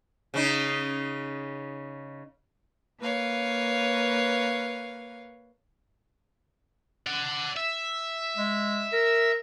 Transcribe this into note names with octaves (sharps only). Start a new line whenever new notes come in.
C#3 C#4 D#4
A#3 B4 C#5 F5
D5 F#5
E5
G#3
A#4